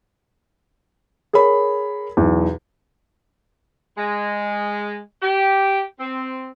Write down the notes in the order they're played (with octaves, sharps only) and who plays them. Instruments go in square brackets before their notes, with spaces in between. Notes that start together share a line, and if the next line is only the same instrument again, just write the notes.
[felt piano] G#4 A#4 C#5 B5
B1 E2
[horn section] G#3
G4
C4